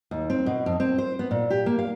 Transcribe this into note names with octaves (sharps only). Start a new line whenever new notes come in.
D#2
C4
B2
F2
C4
C5
B3
A#2
G4
A#3
F5